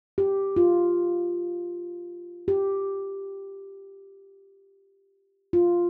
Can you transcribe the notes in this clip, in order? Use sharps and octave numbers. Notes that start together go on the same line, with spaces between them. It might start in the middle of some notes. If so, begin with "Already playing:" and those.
G4
F4
G4
F4